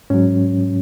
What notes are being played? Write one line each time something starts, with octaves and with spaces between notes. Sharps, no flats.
G#2 F#3 C#4